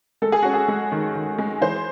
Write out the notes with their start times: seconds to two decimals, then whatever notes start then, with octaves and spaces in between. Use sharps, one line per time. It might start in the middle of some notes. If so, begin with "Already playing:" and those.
0.22 G#3 A4
0.32 G#4
0.43 C#4 F#4
0.54 G#4
0.68 G#3
0.92 D#3
1.15 D#3
1.38 G#3
1.61 E3 C5